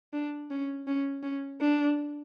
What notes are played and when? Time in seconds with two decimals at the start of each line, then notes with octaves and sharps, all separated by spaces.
0.13 D4
0.51 C#4
0.88 C#4
1.23 C#4
1.61 D4